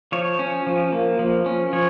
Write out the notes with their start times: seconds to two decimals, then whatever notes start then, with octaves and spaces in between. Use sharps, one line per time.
0.12 F3 C#5
0.39 C#4
0.67 F3
0.92 A#3
1.19 F3
1.46 C#4
1.73 F3 C#5